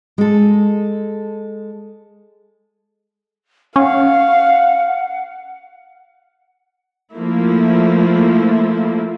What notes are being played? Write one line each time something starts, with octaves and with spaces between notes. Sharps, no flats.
G#3 A4
C#4 F5 F#5
F3 A3 A#3 E4